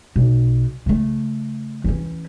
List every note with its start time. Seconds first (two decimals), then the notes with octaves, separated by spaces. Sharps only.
0.16 B1
0.86 C#3 A3
1.84 E3 C#4